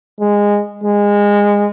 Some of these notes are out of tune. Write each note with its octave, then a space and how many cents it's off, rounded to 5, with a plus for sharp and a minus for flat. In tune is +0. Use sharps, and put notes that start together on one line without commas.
G#3 -15
G#3 -20